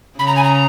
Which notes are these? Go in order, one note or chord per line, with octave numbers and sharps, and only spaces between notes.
C#3 B5
A#5
G#5
A#5